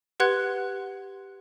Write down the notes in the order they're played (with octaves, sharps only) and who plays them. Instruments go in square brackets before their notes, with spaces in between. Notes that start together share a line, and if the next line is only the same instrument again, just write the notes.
[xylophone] G4 B4 F#5 C6 F#6 G#6